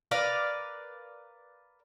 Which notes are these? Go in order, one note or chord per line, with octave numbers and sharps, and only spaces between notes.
A#4 B4 D5 F5